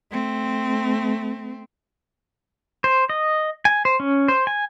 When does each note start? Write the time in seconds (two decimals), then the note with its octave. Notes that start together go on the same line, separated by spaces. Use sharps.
0.11 A3 C4
2.84 C5
3.09 D#5
3.65 G#5
3.85 C5
4.00 C#4
4.28 C5
4.47 G#5